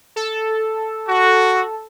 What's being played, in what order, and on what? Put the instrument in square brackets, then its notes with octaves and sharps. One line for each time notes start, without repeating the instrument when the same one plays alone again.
[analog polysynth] A4
[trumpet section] F#4